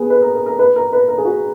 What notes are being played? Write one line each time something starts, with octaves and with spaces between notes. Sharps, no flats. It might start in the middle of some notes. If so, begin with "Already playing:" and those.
Already playing: B3 G#4
B4
A#4
A#4
A#4
B4
A#4
B4
A#4
G#4
F#4